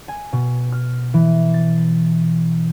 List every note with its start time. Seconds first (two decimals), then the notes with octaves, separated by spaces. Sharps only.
0.08 G#5
0.33 B2
0.72 F6
1.14 E3
1.54 A6